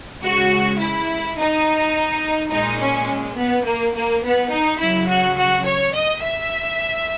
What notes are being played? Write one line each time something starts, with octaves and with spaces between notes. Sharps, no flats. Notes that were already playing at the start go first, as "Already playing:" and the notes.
C#3 G#3 F#4
E4
D#4
A#2 G#3 D#4
C#4
B3
A#3
A#3
B3
D#4
C#3 F#3 E4
F#4
F#4
C#5
D#5
E5